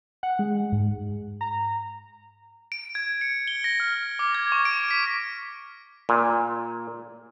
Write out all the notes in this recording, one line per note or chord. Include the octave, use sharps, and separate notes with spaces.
F#5
G#3
G#2
A#5
D7
G#6
C#7
G7
A#6
F6
D6
G#6
C#6
D7
B6
A#2